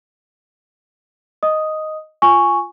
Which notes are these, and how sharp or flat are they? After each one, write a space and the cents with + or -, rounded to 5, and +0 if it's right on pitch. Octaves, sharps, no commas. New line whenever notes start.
D#5 +0 D#6 +0
F4 +0 G#5 +0 C#6 +0